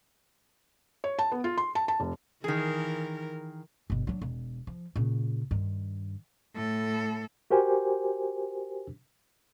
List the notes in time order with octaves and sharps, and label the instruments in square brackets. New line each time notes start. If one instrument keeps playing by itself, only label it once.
[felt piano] C#5
A5
B3
F4
C6
A5
A5
F1
[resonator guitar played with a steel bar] D#3 G#4 [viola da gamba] E3 A#4
[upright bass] G1 B2
F#3 D4
E1
F3
A#2 C#3
G2 D#3
[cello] A2 A4
[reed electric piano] F#4 G4 A#4 C5 G#5